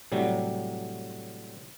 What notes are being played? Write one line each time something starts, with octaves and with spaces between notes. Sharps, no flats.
A2 C3 F#3 G3